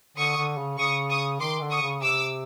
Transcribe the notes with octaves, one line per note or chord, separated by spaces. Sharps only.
D3 C#6 D#6
D3
C#3
C#3 C#6 D#6
C#6 D#6
D#3 C6 D6
D3
C#6 D#6
C#3
C3 D6 E6